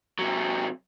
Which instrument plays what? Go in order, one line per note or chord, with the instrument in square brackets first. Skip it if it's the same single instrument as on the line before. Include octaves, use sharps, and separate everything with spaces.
[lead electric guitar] C3 F#3